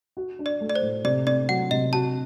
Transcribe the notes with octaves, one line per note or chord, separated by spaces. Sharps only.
F#4
D4
D5
A3
D5
C5
A2
C3 D5
C4 D5
F#3 F#5
C3 D#5
F#4 A5